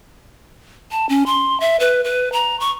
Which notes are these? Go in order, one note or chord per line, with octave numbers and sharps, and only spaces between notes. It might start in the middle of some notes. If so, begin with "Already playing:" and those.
A5
C#4
C6
E5
B4
B4
A#5
C#6